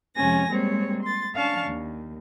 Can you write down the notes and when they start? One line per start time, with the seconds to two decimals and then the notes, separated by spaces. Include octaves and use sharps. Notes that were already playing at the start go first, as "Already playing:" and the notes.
0.16 F2 C3 G#3 C#4 G#5 A#6
0.49 G3 G#3 A#3 C4 C#5
1.02 C6 A6
1.35 C#4 D4 F5 A5 C#6
1.65 D#2